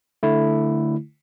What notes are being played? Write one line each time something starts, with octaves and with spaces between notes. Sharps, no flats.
D3 A3 E4